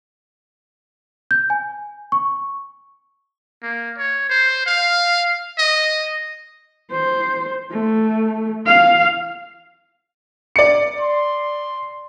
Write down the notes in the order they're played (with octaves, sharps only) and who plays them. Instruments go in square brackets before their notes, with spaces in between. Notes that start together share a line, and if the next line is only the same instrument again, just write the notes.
[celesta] G6
G#5
C#6
[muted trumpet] A#3
C#5
C5
F5
D#5
[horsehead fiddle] C5
A3
F5
[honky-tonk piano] D5 C#7
[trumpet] C6